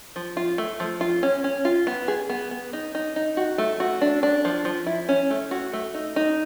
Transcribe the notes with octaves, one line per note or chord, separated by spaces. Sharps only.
F3
F4
A3
F3
F4
C#4
C#4
F4
B3
G#4
B3
B3
D#4
D#4
D#4
F#4
A3
F#4
D4
D4
F3
F3
E4
C#4
A3
F#4
A3
D#4
D#4